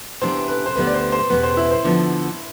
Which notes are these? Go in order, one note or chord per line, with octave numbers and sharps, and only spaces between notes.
C3 E3 G3 B3 D4 C5
B4
C5
D2 D3 G3 B3 B4
D5
C5
C5
E2 B2 G3 B3 B4
C5
E4
C5
D3 F3 B3 D4